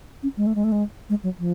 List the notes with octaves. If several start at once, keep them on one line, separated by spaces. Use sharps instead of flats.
C#4
G#3
A3
G#3
A3
G#3
G#3
F#3
F3